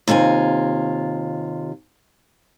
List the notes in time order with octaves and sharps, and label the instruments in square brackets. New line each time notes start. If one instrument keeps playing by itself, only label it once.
[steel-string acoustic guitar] D#2 C3 F4 A4 G#5